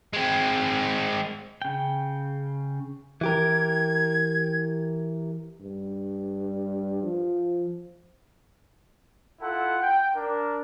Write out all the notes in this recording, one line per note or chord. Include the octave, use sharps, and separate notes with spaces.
G#3 C4
C#3 G5
E3 G4 A#4 G#6
G2
F3
E4 F4 A4 F#5
G5
D4 A#4